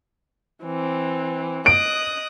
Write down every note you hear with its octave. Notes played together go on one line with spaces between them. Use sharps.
E3 C4
D#5 D#6 F#6 D7